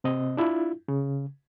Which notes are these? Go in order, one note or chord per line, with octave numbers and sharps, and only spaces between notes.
C3 C4 D#5
D4 E4 F4
C#3